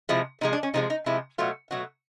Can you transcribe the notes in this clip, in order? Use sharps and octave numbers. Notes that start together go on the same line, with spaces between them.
C3 F3 G#3 E4
C3 F3 G#3 D#4
D4
C#4
C3 F3 G#3 D#4
D#4
C3 F3 G#3 E4
B2 F#3 A3 F4
B2 F#3 A3 F#4